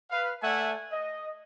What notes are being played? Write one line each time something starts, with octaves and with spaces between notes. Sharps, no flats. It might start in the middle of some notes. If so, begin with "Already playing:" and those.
B4 F5
A3 D5 E5 F#5 G#5
D#5